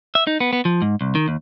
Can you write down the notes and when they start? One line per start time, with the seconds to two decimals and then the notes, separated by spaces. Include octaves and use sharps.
0.15 E5
0.27 D#4
0.40 B3
0.53 B3
0.65 F3
0.82 G#2
1.01 C2
1.15 D#3
1.28 D#2